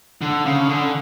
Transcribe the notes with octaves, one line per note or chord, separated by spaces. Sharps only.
D3
C#3
D3